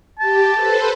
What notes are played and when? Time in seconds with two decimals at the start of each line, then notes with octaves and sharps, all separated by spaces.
0.19 G4 A5
0.52 A4 B4 C5